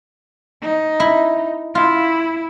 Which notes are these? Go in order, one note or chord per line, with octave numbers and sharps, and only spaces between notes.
D#4
E4
E4 F4